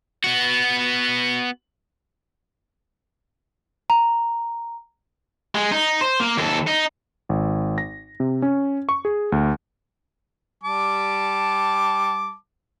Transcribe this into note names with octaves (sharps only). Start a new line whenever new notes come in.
B3 F#4
A#5
G#3
D#4
C5
A#3
D#2 A4
D#4
G#1
A#6
C3
C#4
C#6
G#4
D2
G3 A5 D6